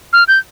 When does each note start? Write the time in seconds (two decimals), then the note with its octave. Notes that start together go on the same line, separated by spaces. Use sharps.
0.13 F6
0.28 G6